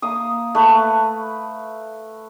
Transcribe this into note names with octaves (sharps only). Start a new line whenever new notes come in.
A#3 E5 F5 D#6
A3 B4